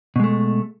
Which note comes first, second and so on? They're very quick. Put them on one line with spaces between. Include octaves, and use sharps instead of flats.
B2 G#3 A3